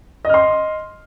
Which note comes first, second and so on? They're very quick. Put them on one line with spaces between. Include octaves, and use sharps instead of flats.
D#5 F6 C6